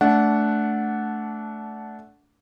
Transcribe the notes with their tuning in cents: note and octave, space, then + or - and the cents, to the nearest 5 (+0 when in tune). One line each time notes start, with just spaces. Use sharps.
A3 -10 D4 -20 F#5 +0